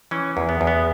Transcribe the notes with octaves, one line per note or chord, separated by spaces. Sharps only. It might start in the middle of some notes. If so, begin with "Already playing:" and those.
E3 C#4
E2
B3
E2
B3